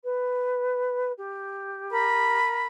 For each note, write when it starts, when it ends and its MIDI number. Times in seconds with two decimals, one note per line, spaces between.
0.04 1.12 71
1.18 2.38 67
1.89 2.66 70
1.89 2.66 83